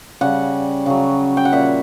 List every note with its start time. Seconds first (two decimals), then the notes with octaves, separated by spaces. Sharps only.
0.21 C#3 G3 F#5
0.86 C#3 F#3
1.37 G5
1.45 F#5
1.53 A#2 G3 E5